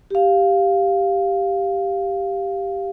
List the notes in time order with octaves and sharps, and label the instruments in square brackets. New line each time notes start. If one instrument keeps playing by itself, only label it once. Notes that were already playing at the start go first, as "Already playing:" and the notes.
[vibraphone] G4 F5